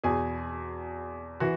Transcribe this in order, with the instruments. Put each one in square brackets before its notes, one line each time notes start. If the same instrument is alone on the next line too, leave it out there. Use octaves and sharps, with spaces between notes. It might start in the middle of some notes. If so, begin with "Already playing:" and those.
[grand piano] E2 B2 G#4 G#5
E3 F#4